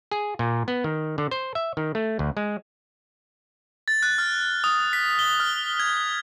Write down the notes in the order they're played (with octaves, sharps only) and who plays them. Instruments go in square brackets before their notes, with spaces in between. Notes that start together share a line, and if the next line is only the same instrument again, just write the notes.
[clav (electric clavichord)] G#4
A#2
B3
D#3
D3
C5
E5
D#3
A3
D2
G#3
[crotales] A6
F#6
F6
D#6
B6
G7
F6
G#6